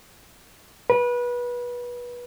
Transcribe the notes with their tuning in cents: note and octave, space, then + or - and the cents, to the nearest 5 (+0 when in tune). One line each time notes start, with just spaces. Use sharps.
B4 -25